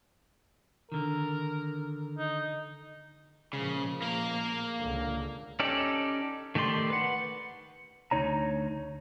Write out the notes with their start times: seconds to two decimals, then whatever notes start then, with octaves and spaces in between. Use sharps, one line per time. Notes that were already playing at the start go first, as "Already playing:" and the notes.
0.92 D3 D#3 A#4
2.18 D#4
3.53 A#2 C#3 F3 G#3
4.02 A#3 A#4
4.78 C#2 D3
5.60 C#4 D#4 G4 A4 D5
6.55 D#3 A3 G4 D5 C6
6.90 B4 F#5
8.11 D2 D#4 C#5 A#5